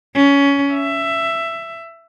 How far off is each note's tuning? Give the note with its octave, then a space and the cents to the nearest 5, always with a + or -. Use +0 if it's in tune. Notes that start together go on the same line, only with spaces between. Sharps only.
C#4 +20
E5 +15